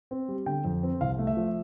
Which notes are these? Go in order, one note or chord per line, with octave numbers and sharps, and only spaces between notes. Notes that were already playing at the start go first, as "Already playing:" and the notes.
C4
G3
D3 G5
F2
C4
C2 F5
A3
E5
F3